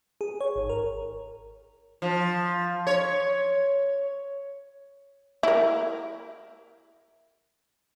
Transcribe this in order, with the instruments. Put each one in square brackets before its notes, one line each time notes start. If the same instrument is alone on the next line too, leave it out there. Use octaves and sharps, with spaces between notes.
[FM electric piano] G#4
C#5
G#1
A#4
[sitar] F3
C#5
[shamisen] E4 A#4